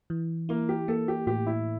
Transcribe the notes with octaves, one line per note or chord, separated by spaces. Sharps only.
E3
A#3 E4
G4
A#3 A4
G4
A2 G4
E4